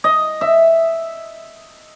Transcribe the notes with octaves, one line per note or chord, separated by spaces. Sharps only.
D#5
E5